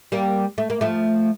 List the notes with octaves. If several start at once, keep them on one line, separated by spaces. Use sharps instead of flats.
G3 A#3
A3
A#3
F3 A3